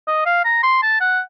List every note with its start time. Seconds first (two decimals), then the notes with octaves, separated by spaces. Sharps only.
0.08 D#5
0.26 F5
0.45 A#5
0.63 C6
0.83 A5
1.01 F#5